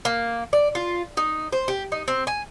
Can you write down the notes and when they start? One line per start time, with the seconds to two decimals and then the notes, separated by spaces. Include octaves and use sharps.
0.05 A#3
0.53 D5
0.75 F4
1.17 D#4
1.53 C5
1.68 G4
1.92 D#4
2.08 C4
2.27 G#5